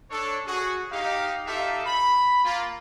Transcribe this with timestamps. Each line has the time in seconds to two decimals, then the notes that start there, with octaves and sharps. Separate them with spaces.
0.11 D4 A4 C#5
0.47 F#4 G#4
0.92 D#4 G4 F5
1.46 D#4 F4 G4 A4 E5 F5
1.86 B5
2.45 A#3 F4